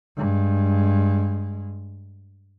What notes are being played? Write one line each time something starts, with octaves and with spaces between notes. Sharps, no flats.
G2 G#3